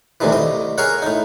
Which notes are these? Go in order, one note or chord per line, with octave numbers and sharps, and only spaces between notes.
D2 A2 C3 D#3 E3
C2 D#5 D#6
G#4 A#4 C#5 F#5
A2 D#4